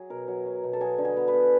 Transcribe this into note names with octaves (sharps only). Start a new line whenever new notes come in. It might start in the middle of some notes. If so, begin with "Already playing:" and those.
Already playing: F#3 G#4
B2 A#4
F#3
F#3
B2
A4
F#3 G#4
D3
G#4
B3
B4
B3